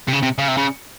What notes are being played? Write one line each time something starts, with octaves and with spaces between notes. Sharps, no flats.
C3
C#3
C3
C#3
C3
C#3